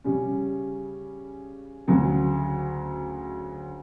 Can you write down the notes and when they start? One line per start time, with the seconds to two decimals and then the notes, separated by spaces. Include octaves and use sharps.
0.04 C#3 G3 C#4
1.88 D2 C#3 F#3